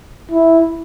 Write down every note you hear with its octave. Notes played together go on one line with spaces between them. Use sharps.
E4